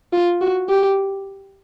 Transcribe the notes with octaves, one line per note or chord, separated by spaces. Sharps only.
F4
F#4
G4